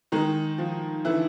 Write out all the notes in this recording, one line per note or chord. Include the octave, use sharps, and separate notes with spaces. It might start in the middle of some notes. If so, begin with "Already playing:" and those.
D#3 G#3 D#4
F3
D3 E3 E4